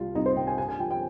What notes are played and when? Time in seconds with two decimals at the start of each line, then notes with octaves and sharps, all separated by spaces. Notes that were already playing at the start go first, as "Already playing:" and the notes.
Already playing: C2 G3 F4
0.15 C2 D#4
0.26 C5
0.36 C2 G5
0.47 G#5
0.57 G2 G#5
0.69 G#5
0.79 F3 G5
0.91 G5